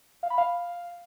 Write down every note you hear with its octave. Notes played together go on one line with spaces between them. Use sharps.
F5
B5
F5